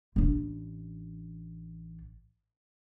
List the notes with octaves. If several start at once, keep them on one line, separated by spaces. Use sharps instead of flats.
A1 D4